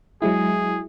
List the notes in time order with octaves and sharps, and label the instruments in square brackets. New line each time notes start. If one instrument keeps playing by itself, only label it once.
[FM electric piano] F#3 G#3 E4 [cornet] G#4